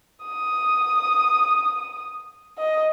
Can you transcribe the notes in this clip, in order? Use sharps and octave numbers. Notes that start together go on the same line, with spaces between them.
D#6
D#5